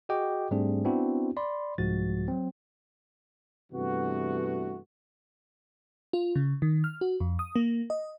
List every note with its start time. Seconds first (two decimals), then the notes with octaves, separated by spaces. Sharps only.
0.09 F#4 G#4 D#5 G5 D6
0.51 G#2 G3 A3 C4 D4 G#4
0.85 B3 C4 D4 E4 F#4
1.37 D5 B5 C6
1.78 C2 G#2 F3 G#3 F#4 A6
2.28 F#3 C4
3.72 G2 C3 E3 A3 B3 F#4
6.13 F4
6.36 C#3
6.62 D#3
6.84 F6
7.01 F#4
7.20 F2
7.39 D#6
7.56 A#3
7.90 D#5